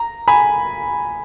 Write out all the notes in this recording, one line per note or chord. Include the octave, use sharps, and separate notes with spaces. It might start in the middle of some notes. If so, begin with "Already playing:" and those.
Already playing: A#5
G#5 B5